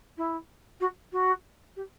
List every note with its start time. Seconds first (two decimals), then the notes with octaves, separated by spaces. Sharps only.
0.18 E4
0.80 F#4
1.13 F#4
1.76 G4